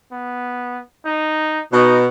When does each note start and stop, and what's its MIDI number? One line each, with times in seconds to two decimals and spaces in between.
0.12 0.79 59
1.05 1.62 63
1.73 2.06 47
1.73 2.00 63